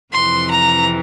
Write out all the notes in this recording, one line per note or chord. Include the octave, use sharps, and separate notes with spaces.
F2 C3 E3 C6
A#5